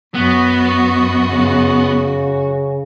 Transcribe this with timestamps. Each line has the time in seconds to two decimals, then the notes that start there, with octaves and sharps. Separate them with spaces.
0.15 F#2 B3 F#4
1.30 C#3